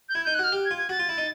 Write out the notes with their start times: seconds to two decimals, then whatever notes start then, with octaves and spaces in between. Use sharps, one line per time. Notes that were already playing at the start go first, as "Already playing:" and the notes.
0.08 G6
0.15 E4 G#6
0.24 D#4 G6
0.34 F#6
0.39 F#4
0.43 F6
0.52 G4
0.65 G#6
0.71 F4
0.77 G#6
0.89 F#4 A6
0.99 F4
1.09 E4
1.18 D#4